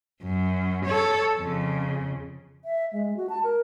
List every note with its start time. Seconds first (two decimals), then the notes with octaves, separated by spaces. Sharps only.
0.22 F#2
0.86 A4 C#5
1.39 F2 C#3
2.65 E5
2.93 G#3
3.17 F#4
3.29 A5
3.44 A#4